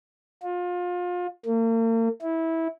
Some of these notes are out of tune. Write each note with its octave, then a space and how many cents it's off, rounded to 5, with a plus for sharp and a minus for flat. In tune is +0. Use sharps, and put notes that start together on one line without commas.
F4 +30
A#3 -40
E4 -15